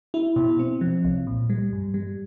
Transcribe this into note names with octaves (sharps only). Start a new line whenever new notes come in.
E4
B2
C4
F3
C2
A#2
G3
G2
G3